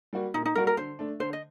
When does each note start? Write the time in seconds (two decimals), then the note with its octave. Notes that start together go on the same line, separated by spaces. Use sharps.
0.13 G3 A#3 F#4
0.34 A#2 D#4
0.46 D#4
0.55 G3 A#3 F#4 A#4
0.67 A#4
0.77 D3 C5
0.99 A3 D4
1.20 D3 C5
1.33 D#5